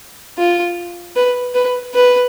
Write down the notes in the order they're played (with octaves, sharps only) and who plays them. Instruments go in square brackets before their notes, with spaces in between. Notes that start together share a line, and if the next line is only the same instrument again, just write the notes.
[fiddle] F4
B4
B4
B4